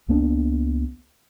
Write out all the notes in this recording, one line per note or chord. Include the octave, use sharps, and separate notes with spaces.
C#2 A#3 B3 D4